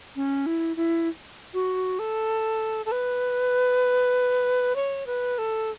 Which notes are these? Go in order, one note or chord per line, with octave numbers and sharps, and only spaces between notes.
C#4
E4
E4
F#4
A4
A4
B4
C#5
B4
A4